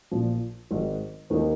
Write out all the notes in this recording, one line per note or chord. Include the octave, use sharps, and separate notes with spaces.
A#1 A#2 F3
G#1 G#2 D#3
D#2 D#3 A#3 D#4